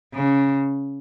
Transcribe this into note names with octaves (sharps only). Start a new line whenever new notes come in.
C#3